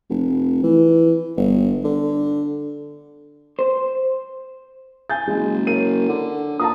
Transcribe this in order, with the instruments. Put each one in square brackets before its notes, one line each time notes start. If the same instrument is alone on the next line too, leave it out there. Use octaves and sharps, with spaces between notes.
[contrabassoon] F1
E3
G1
D3
[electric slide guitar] C5
[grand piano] G#5 G6 A6
[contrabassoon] F#1 [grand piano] G#3
[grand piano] A#4 C#5 D#7
[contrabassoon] D3
[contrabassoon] A#2 [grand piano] A5 A#5 D#6